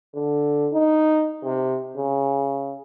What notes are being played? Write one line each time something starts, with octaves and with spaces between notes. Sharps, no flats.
D3
D#4
C3
C#3